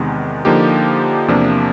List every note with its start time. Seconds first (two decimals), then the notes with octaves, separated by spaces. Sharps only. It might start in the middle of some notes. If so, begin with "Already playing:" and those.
Already playing: E2 C3 D#3 G#3 B3
0.45 D3 F3 A#3 D#4 G4
1.28 E2 C3 F3 A#3 D4